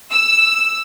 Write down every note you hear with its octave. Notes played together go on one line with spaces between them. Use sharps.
E6